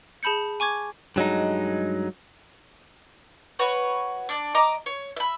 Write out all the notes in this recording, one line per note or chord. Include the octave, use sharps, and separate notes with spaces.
G#4 A5 B5 G6 C#7
G#5 C#6 D6 G#6
G2 F#3 G#3 D#4
F#4 B4 C#5
D4 D5
D#5 A#5 D6
C#5
E5 B5